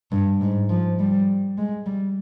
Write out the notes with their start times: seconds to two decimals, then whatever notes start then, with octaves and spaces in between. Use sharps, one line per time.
0.12 G2
0.41 G#2
0.70 F3
0.99 G3
1.58 G#3
1.86 G3